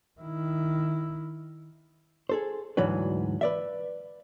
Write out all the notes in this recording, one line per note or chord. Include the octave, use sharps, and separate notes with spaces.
D#3 E4
G#4 A4 C5
D2 G#2 E3 F#3 D4 B4
B4 D5 E5